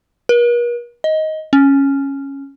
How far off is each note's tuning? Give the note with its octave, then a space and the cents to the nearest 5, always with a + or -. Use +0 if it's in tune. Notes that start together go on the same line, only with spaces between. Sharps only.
A#4 +45
D#5 +10
C#4 -10